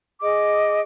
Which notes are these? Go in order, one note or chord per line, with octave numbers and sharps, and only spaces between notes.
G#4 D#5 D6